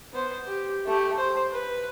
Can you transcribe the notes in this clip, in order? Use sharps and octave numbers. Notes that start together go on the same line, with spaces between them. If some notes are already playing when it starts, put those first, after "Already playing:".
B3 C5
G4
A3 G4
C5
B4